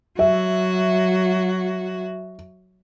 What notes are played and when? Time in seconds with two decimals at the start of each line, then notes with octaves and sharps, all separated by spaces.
0.19 F#3 F#4 E5